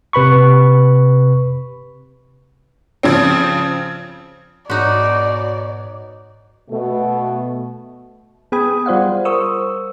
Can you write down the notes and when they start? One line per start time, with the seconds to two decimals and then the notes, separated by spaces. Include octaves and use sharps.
0.13 C3 B4 B5 C#6
3.03 C#3 F3 C4
4.70 G#2 B2 D#4 F#4 C#5 D5
6.70 B2 A3
8.52 B3 G#4 G5 B5 D#6 G#6
8.86 G3 F4 C5 D5 F5 F#5
9.25 A#4 C5 C#6 D#6 E6